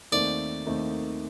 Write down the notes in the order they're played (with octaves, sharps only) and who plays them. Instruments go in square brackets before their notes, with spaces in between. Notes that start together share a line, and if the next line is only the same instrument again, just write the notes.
[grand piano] D#2 D#3 A3 C4 D#4 [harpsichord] D5
[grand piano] D#2 D#3 A3 C4 D#4